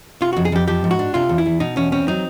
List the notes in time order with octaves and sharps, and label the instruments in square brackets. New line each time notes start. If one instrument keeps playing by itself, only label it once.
[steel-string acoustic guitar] C3 [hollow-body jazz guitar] F4
[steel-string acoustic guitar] F2 [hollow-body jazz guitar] F#4
[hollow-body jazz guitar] G#4
[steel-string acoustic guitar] F2 [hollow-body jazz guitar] G4
[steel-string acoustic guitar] F3 [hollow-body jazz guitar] G4
[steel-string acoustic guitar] G#2
[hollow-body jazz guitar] F#4
[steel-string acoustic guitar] D4
[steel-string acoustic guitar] C3 [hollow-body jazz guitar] F4
[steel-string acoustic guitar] E2
[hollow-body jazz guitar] E4
[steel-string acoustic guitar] E2
[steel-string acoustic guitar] B2 [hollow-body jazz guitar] D#4
[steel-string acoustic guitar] E2 [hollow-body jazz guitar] C#4
[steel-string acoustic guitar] C4 [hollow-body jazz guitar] C#4
[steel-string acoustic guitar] F#3 [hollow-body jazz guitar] D#4